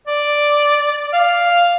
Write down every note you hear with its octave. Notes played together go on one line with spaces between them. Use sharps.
D5
F5